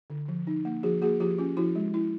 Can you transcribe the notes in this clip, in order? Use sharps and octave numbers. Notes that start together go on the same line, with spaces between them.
D3
F3
D#4
A#3
F3 F#4 G#4
A#3 F#4 G#4
F3 F4 G4
C#4 F4
F3 E4 F#4
G#3
E4